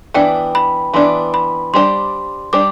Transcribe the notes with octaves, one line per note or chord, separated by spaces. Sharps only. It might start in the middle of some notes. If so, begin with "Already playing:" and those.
E3 B3 D4 G5
B5
E3 B3 D4 C6
B5
G3 D4 G4 C5 C6
G3 D4 G4 C5 D6